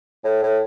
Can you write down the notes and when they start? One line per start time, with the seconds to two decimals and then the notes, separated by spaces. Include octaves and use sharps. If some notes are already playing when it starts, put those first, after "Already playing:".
0.24 A2
0.43 A2